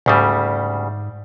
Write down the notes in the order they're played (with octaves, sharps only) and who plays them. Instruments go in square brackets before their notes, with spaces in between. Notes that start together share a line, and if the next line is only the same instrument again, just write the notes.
[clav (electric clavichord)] D2 C#3 G3 [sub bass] G#2